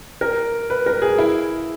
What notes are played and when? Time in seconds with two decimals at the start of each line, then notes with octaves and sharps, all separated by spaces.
0.21 A#4
0.70 B4
0.86 A#4
1.02 G#4
1.18 E4